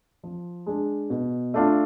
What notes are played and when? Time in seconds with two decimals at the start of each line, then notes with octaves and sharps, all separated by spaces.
0.23 F3
0.66 G#3 D4
1.10 B2
1.54 A3 D4 F4